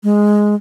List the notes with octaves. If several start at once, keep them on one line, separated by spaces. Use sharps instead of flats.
G#3